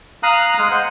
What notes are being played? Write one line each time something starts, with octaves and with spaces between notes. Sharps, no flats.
F5 A#5 D#6 F#6
G#3 G#4 F#6
C5 F#5